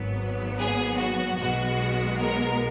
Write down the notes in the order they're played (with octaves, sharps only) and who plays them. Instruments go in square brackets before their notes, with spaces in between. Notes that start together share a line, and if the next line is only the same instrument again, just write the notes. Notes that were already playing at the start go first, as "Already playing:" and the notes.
Already playing: [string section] G#1 G#2 F#3 B3
G#4
F#4
B1 B2 G#3 B3 F#4
A#4